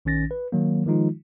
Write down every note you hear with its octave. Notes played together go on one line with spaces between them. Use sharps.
A#1 D#3 C#4 A6 A#6
B4
D#3 F#3 A#3
D#3 F3 G#3 D#4 F4